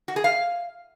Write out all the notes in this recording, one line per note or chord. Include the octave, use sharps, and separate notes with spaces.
F#4
G#4
F5